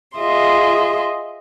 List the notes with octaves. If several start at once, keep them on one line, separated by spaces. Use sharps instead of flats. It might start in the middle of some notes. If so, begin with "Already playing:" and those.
F4 G#4 D#5 E5 C6